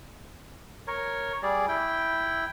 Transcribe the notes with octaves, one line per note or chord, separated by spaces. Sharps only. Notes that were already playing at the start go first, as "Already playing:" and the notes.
A#4 C#5
G3 G#4 D5
E4 G5